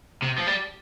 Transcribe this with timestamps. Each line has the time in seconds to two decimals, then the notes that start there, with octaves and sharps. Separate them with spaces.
0.22 C3
0.38 F3
0.47 G3